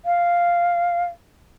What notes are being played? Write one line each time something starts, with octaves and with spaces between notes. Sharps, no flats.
F5